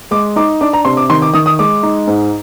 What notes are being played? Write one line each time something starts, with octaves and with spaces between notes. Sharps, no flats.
G#3 D6
D#4 D6
D4 D6
A#5
C3 C6
D6
D#3 C6
D6
D#3 D#6
D#6
G#3 D6
D#4
G#2